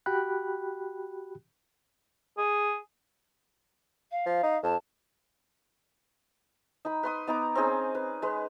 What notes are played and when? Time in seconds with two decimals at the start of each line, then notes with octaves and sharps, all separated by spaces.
0.06 F#4 G4 G5 B5 F#6
2.38 G#4
4.11 F5
4.26 F3
4.43 D#4
4.63 F2 A5
6.85 D#4 B5
7.03 B4 C6 D#6
7.27 B3 D#4 A#5 D6
7.55 C4 C#4 D#4 G#4
7.95 B4
8.22 G#3 B4